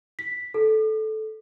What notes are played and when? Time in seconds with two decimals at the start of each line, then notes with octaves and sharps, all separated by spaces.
0.19 B6
0.54 A4